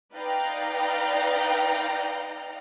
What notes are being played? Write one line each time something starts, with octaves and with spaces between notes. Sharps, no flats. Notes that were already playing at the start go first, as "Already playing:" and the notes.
D#4 B4 D5 F5 G5 A#5